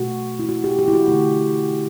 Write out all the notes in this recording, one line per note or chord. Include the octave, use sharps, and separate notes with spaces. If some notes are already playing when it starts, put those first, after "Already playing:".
Already playing: B2 A3 F#4
E4
F#4
G4
G4
E4
F#4
D3 A3 E4